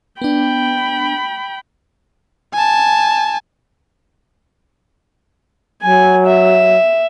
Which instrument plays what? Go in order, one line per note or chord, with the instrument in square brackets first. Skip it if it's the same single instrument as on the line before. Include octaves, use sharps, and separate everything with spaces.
[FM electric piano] B3 D4 [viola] G5 B5
[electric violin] G#5 A5
[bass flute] F#3 [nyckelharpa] G#5
[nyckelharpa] E5